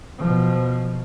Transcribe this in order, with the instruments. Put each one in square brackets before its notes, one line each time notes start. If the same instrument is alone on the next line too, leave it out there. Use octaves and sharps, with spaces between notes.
[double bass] B2 F3